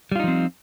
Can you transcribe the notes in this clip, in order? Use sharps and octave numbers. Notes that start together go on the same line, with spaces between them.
F3 G3 C4 D#4 F4